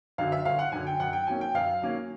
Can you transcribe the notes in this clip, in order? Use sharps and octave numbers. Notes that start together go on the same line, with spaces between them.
F#2 D3 F#3 F5
E5
G1 F5
F#5
F#2 D3 F#3 G#5
G5
F#2 F#5
G5
D#3 F#3 A#3 C#4 G#5
G5
F#2 F5
D#3 F#3 A#3 C#4